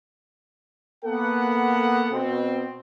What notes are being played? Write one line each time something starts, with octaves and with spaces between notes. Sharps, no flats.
A#3 B3 A4 F#5
B2 C4